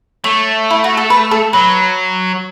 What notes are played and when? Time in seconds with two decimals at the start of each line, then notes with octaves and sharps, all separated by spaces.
0.24 A3 C#5
0.71 E4
0.84 F#4
0.97 A4
1.10 B4
1.31 A4
1.53 F#3 B4